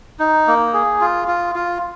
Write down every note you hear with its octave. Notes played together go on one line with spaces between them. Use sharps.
D#4
A#3
G#4
F4
F4
F4